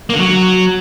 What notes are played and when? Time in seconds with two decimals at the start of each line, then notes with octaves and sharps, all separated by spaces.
0.09 A#3
0.15 D3
0.20 F#3